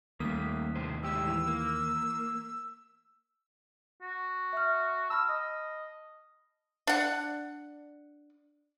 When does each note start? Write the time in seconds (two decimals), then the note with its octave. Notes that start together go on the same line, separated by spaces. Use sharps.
0.20 D#2 G3 A3 A#3 D#6 B6
0.76 A2 C3 C5
1.03 A2 G#3 G4 E6
1.28 E3
1.47 A#3
4.02 F#4
4.53 E5 F6
5.10 A5 B5 E6 F6
5.29 D#5
6.87 D4 F#5